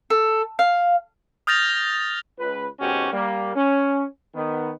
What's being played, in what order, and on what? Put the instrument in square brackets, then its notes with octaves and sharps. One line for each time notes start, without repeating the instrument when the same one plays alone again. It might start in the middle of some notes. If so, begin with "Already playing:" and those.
[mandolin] A4
F5
[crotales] D#6 F6 G6 A6 A#6 F7
[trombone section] C#2 B4
G#1 G#2 B2 C#4 F#4 G4
G3 A#3
C#4
D#3 B3